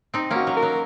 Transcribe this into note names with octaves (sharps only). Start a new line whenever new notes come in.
C4 D#4
A#3 C#4 F#4
F#3
A#4
F#3